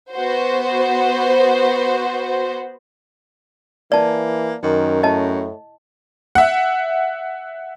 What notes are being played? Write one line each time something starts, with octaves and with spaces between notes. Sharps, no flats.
B3 F#4 C5
E3 A#3 D5 A5
F#2 D#3
A2 E4 D#5 A5
E5 F#5